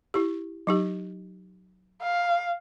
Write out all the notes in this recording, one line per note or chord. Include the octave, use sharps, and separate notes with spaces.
E4 G4
F#3 D#4 G4
F5